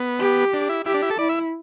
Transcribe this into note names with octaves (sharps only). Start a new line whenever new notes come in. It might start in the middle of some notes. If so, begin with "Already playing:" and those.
Already playing: B3
G4
D4
E4
E4 G4
D4
E4
A4
E4 D5
E5